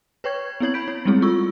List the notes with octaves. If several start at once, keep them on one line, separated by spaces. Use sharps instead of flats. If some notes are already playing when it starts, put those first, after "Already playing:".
B4 C#5 G5 C#6 G#6
B3 C4 E4 C#5 G#6 F#7
B5 G6 B6 D7
E4 C#5
G3 G#3 B3 C4 E4 G#4
F4 A4 C#6 E6